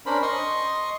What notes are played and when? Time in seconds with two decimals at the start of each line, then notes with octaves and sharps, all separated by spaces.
0.06 C#4 D4 A#4 C5 B5
0.22 D#5 C6 C#6 D#6